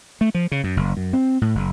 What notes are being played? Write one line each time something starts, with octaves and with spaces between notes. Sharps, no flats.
A3
F3
C#3
F#2
F#1
F#2
C4
A2
F#1